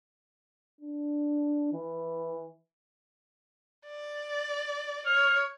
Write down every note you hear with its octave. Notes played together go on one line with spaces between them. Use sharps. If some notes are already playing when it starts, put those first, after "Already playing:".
D4
E3
D5
C#5 F6